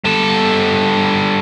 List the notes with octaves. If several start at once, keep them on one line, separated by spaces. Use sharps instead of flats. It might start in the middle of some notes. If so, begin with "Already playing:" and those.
G3 A4